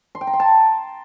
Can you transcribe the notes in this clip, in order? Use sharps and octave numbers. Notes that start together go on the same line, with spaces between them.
C6
G5
A#5
C6
A5